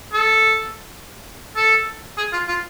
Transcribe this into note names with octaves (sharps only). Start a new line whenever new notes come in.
A4
A4
G#4
F4
F4